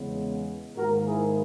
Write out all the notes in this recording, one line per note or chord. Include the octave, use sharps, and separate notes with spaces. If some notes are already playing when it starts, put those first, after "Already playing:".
Already playing: E2 C#3 G#3 B3
G#2 D#3 A#3 F#4 A#4
E4 G#4